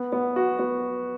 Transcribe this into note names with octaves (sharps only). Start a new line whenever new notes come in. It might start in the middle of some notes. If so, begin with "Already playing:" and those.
Already playing: B3
B3
F#4
B3